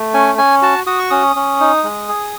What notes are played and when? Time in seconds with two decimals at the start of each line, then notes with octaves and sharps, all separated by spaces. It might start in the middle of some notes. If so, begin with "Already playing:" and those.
Already playing: A3
0.14 C#4 G#5
0.38 C#4 G#5
0.62 F#4 A5
0.86 F#4 D#6
0.99 C#6
1.11 C#4 D#6
1.36 C#4
1.60 D#4
1.84 G#3
2.09 G#4